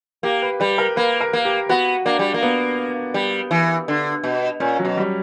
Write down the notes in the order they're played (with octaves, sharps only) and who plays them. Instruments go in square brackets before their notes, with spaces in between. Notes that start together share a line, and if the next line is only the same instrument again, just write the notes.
[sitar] A#3 [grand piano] G4
[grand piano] B4
[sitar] G3 [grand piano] B4
[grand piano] A#4
[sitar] A#3 [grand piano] B4
[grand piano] A#4
[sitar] A#3
[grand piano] G4
[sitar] B3 [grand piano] F#4
[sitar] A#3 [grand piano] D4
[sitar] G3
A#3
[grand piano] B3
[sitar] G3
E3
D3
B2
[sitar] A#2 [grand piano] C#4
[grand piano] F#3
[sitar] B2
[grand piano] G3